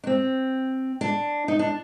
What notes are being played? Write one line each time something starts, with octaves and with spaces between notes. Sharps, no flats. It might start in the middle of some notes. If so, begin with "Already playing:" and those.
D4
C4
D4
D#4
D4